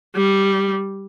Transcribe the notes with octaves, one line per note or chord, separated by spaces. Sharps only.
G3